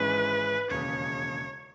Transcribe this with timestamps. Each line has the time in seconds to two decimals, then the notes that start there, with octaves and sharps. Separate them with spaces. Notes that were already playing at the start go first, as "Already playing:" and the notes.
Already playing: G#1 G#2 E3 G#3 C#4 B4
0.70 E1 D#2 C#3 C#5